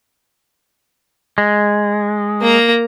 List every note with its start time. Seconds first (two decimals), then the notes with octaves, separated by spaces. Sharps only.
1.38 G#3
2.42 A#3 A#5